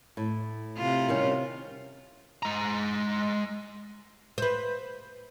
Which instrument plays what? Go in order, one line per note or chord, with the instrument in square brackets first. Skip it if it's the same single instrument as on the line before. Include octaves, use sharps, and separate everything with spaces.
[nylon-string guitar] A2
[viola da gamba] C3 F4
[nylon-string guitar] D#3 G3 C#4
[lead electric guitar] G#3 A#5
[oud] B4 C5